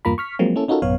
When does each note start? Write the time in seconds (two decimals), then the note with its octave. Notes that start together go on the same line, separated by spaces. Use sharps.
0.05 E2 G2 A#3 F4 A#5 B5
0.18 C#6 F6 B6
0.39 F3 F#3 G#3 A#3 C4
0.55 A#3 C#4 E4 A4
0.68 C#4 D#4 F4 F#4 A4 A#4
0.82 A1 F#2 B2 B3 C#5 F5